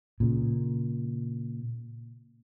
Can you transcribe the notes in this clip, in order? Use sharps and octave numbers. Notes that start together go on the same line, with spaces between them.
A#2 C#3